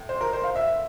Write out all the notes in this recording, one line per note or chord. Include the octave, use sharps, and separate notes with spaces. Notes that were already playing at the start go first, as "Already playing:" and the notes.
Already playing: A2
C5
A#4
C5
F5
E5